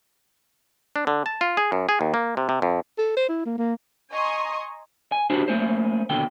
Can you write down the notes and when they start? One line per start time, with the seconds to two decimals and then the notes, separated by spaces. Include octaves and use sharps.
0.96 D4
1.07 D3
1.26 A5
1.41 F4
1.57 G#4
1.72 F#2
1.89 G#4
2.01 D#2
2.14 A#3
2.37 C3
2.49 C3
2.62 F2
2.98 A4
3.16 C5
3.29 E4
3.46 A#3
3.58 A#3
4.11 D#5 G#5 A#5 C6 C#6 D#6
5.12 G#5
5.30 D4 E4 F#4 G4 C5
5.48 A3 A#3 C#4 C5
6.10 D#2 B2 D3 G5